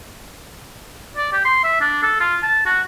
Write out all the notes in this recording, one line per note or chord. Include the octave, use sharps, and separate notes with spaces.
D5
G4
C6
E5
D4
A4
F4
A5
F#4